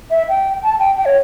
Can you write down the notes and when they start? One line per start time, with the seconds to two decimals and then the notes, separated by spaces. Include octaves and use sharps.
0.11 E5
0.29 G5
0.63 A5
0.79 G5
0.97 G5
1.05 C#5